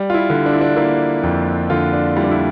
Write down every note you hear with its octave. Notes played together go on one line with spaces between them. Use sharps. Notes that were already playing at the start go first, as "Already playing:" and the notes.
Already playing: G3
F4
E4
D3
D4
E4
D4
A#3 E4
F2
D3 F4
D4
G3 E4
D4
E4